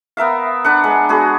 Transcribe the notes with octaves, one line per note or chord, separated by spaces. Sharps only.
B3 A#4 E5 F5
D4 B4 F#5
G#3
B3 F#4 G#4